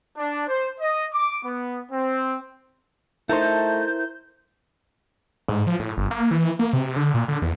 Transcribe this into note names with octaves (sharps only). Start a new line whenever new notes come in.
D4
C5
D#5
D6
B3
C4
A3 D#4 E4 A4 A#4 C5 G6
G#2
F3
A2
G1
A#3
E3
A#3
C3
D3
A#2
D3
E2